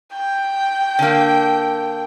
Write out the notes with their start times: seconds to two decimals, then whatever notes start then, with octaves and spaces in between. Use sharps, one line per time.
0.14 G5
0.99 D3 A#3